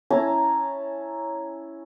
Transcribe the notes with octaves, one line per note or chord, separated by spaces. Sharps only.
C#4 E4 A5 A#5